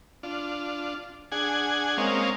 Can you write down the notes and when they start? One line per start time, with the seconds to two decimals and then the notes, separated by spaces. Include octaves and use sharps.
0.23 D4 F4
1.32 D4 G#4 F#5 G#5
1.98 G#3 A#3 C4 C#4 D#5 F5